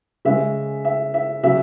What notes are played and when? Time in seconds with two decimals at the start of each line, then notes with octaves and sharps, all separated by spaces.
0.25 C#3 G#3 E5
0.85 E5
1.14 E5
1.43 C#3 F#3 E5